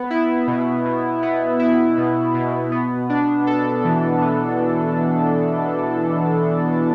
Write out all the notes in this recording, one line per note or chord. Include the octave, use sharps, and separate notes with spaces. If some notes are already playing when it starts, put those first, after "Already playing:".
Already playing: B3
E4
B2
B2
B3
E4
B2
B2
B3
D4
A4
E3
B3